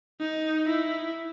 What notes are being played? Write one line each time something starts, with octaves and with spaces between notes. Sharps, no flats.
D#4
E4